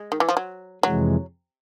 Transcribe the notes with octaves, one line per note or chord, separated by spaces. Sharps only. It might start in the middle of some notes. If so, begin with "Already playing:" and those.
Already playing: G#3
D#3
E3
F3
F#3
F2 C3 E3 F#3 G#3